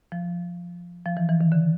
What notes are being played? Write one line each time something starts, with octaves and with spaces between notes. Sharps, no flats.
F3
F3
E3
E3
D#3
D3